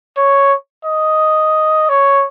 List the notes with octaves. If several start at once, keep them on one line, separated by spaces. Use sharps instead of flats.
C#5
D#5
C#5